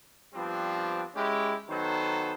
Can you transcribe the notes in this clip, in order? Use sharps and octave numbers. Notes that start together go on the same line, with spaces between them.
F3 G3 B3 C4 D4
G#3 C#4 E4 G4
D#3 F#3 B3 A4 C5